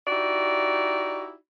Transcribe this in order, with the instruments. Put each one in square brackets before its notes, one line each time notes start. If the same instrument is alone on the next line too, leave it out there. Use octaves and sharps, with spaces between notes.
[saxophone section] D#4 E4 F#4 G4 D5